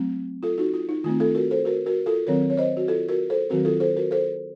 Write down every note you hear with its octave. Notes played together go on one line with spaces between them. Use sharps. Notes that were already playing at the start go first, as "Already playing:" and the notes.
Already playing: F#3 A3 C4
F4 A4
D#4 F#4
F4
D#4
D#3 A3 C4 F4
F4 A4
F#4 A#4
A4 C5
F#4 A#4
F#4 A#4
F4 A4
D#3 F#3 C4 A#4 C#5
C#5
C5 D#5
F#4
F4 A4
F#4 A#4
A4 C5
D#3 F#3 C4 F#4 A#4
F4 A4
A4 C5
F#4 A#4
A4 C5